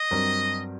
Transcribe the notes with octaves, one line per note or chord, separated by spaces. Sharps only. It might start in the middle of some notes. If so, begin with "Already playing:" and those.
Already playing: D#5
G2 F#3 C4 F#4 A#4